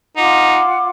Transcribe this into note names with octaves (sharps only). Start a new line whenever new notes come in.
D#4 F4 F#5 D6